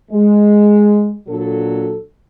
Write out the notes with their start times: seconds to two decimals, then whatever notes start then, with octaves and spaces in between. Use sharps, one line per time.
0.11 G#3
1.28 A#2 F#3 D4 A4